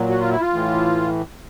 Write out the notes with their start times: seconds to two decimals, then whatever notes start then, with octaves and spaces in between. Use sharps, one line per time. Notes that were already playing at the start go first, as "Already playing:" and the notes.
Already playing: A#2 F#3
0.10 F#4
0.20 F4
0.31 E4
0.41 F4
0.53 A2 E3